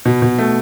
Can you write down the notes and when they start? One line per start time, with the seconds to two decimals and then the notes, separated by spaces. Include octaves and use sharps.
0.05 B2
0.22 B2
0.39 A3